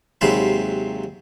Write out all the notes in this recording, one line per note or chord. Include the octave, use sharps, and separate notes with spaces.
D#2 C3 F#3 G#3 C5 B5